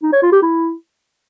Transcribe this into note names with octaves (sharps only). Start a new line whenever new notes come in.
D#4
C#5
F4
G4
E4